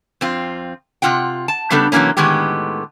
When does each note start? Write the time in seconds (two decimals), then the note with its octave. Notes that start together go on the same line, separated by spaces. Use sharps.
0.21 F2 C4 F4
1.02 C3 E3 F4 F#5 G5
1.48 A5
1.70 C#3 G3 B3 D4 A4
1.92 C3 E3 F#3 G3 A#3 C#4
2.17 A2 D3 D#3 G#3 B3 G4